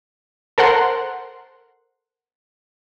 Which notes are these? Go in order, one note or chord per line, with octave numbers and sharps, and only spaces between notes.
A4 A#4 C5 F#5 C6